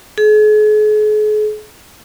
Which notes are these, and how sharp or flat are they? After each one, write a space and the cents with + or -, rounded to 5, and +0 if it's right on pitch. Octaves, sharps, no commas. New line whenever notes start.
G#4 +40